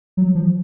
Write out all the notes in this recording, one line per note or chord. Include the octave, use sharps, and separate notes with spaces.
F#3
F3